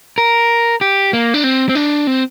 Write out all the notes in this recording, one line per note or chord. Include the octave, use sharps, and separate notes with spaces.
A#4
G4
A#3
D4
C4
C4
D4
C4